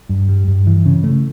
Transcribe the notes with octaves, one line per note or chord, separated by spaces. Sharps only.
G2
G3
G2
E3
C#3
A3